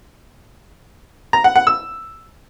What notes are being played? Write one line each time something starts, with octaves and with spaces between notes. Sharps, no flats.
A#5
F#5
F#5
E6